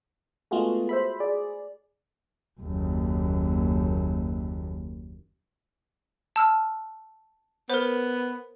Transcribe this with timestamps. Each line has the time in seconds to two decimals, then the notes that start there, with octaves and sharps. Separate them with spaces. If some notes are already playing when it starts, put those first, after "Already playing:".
0.51 G#3 A3 B3 F4 F#4 G#4
0.89 C5 E5 B5
1.20 G#4 D5
2.60 F#1 D#2
6.36 A5 E6 F6
7.70 B3 A#4 C5